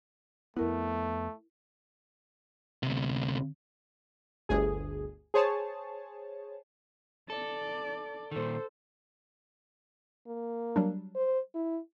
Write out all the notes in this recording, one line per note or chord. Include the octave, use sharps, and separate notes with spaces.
F2 A3 B3 E4 A#4
D2 C3
G1 D2 G#4
G#4 C5 C#5 A5
A4 D5
A#2 D#3 A4 C5
A#3
F#3 G3 D4
C5
E4